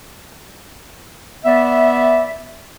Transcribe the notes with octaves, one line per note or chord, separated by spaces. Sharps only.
B3 D5 E5